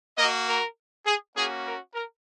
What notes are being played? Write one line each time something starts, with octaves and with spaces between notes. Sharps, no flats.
A#3 F#4 A#4 D#5
A#4
G#4
A#3 C#4 F#4 G#4
A#4
A#4